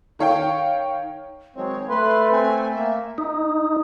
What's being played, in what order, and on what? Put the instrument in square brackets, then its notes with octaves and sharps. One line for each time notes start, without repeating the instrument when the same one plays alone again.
[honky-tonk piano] D#3 C#5 F5 G5
[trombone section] D#3 F#3 G#3 [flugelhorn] C4 [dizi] C#5
[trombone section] A3 [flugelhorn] B4 [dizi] C6
[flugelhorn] C4 [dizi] G#5
[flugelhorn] A#3 [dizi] E5
[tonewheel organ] D#4